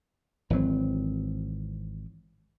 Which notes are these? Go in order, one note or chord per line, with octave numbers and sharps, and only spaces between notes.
G#1 E3 F#3 C4